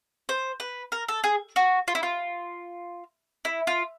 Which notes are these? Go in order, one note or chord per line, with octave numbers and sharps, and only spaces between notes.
C5
B4
A#4
A4
G#4
F#4
F4
E4
F4
E4
F4